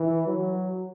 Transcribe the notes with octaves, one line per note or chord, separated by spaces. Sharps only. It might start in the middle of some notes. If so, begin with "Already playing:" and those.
Already playing: E3
F#3